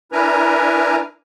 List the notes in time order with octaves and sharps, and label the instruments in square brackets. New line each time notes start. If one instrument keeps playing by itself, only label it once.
[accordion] D4 E4 A#4 B4 G#5 A#5